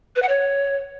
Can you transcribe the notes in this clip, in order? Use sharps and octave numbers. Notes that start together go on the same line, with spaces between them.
B4
F#5
C#5